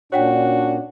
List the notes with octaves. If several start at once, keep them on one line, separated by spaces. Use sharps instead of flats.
A#2 C#4 D4 F#4 C#5 F#5 G5